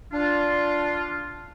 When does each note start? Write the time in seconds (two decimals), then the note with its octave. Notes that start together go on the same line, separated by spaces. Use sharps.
0.13 D4 F4